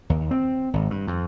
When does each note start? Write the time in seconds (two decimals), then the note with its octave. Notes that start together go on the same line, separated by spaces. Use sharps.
0.10 D#2
0.31 C4
0.73 G#1
0.90 G2
1.07 F2